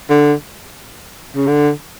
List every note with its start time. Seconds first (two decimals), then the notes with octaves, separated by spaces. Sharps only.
0.10 D3
1.36 C#3
1.47 D3